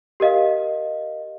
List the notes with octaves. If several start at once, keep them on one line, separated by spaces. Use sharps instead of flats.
G4 A#4 D#5 F5